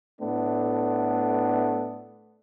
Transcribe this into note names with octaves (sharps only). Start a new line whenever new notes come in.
A2 A3 B3 D4